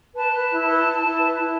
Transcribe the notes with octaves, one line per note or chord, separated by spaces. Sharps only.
B4 A5
B4
E4
B4
E4
E4
B4
E4